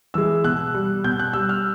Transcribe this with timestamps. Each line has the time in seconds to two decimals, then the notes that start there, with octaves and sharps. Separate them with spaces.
0.14 E3 G#3 E6
0.44 B2 F#6
0.74 G3
1.04 B2 G6
1.19 F#6
1.33 G3 E6
1.49 F6